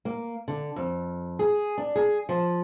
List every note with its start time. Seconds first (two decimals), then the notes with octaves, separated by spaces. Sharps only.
0.05 A#3
0.48 D3
0.76 F2
1.39 G#4
1.78 D4
1.96 G#4
2.29 F3